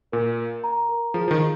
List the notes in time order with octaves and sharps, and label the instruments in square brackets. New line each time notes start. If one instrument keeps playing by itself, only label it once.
[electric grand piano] A#2 [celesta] A#4
[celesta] A#4
A#5
A#4
[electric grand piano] F3 [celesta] G#4
[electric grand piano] F3
D#3
[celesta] G#4